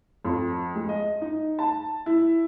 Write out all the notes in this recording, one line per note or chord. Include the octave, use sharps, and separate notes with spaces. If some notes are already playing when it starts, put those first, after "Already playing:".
F2
G#3
D#5
D#4
A5
E4